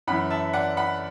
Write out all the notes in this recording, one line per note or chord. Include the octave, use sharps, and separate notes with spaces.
F#2 E3 F#5 B5
E5 A5
D5 F#5
F#5 B5